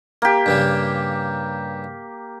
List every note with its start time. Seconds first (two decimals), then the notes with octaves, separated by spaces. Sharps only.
0.22 A#3 G4
0.46 G2 C#3 G3